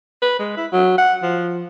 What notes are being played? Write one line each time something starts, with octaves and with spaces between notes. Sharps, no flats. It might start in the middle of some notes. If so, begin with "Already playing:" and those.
B4
G#3
E4
F#3
F#5
F3